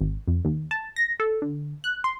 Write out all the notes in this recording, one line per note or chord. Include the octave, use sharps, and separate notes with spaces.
G#1
F2
D#2
A5
A#6
A4
D3
F#6
C6